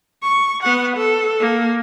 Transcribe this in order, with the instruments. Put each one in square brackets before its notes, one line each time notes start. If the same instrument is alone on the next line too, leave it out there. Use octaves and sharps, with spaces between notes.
[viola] C#6
B3 F#5
A4
A#3